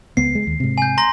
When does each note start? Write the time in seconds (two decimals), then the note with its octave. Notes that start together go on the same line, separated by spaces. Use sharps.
0.17 C#2 B3 C7
0.35 G#3
0.47 D#2
0.60 G#2 C3
0.78 G#5 G6
0.98 A#5 C6 A#6